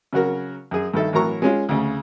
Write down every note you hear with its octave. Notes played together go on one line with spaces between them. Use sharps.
C#3 F#3 F#4 A#4
F#2 G#4
G2 D#3 A4 E5
A2 E3 F#3 A#4 A#5 C#6
G#3 C#4 F4
D2 C#3